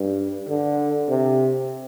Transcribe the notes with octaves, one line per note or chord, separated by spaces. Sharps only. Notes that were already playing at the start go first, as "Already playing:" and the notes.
Already playing: G2
D3
C3